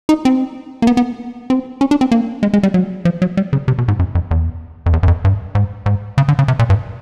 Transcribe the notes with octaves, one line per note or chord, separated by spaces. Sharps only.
D#4
C4
A#3
B3
B3
C4
C#4
D4
C4
A#3
G#3
G#3
G3
F#3
F3
F#3
G3
C#3
C3
B2
G#2
F#2
F2
E2
F2
E2
F#2
F2
G2
G#2
G#2
C#3
D3
C#3
C3
A#2
G2